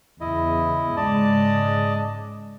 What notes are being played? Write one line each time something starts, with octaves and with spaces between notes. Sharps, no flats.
E2 C#3 E4 D#5
G#2 C#3 G#3 D5 D#5 A5